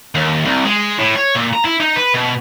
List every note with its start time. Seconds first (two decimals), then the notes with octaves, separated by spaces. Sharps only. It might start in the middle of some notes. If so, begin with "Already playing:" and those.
0.15 D#2
0.45 C2
0.65 G#3
0.99 A2
1.16 C#5
1.35 A#2
1.53 A#5
1.65 E4
1.80 D#4
1.96 B4
2.14 B2